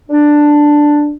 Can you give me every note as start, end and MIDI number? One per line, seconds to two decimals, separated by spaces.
0.10 1.14 62